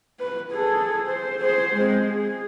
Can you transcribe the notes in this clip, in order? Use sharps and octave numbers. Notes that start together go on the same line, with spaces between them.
B4
G#4 A4
C5
G#4 C5
G#3 C4
G#4